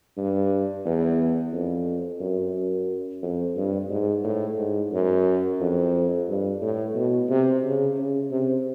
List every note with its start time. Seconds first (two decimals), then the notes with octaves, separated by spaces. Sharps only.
0.17 G2
0.85 E2
1.53 F2
2.21 F#2
3.23 F2
3.56 G2
3.90 G#2
4.24 A2
4.58 G#2
4.92 F#2
5.60 F2
6.28 G2
6.62 A2
6.95 B2
7.29 C3
7.64 C#3
7.97 C#3
8.31 C3